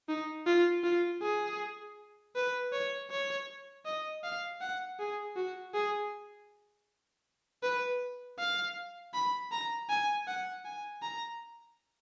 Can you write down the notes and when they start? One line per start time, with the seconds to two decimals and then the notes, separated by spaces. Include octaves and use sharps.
0.09 D#4
0.46 F4
0.84 F4
1.22 G#4
2.36 B4
2.72 C#5
3.11 C#5
3.85 D#5
4.24 F5
4.61 F#5
4.99 G#4
5.36 F#4
5.74 G#4
7.63 B4
8.39 F5
9.14 B5
9.52 A#5
9.89 G#5
10.27 F#5
10.65 G#5
11.02 A#5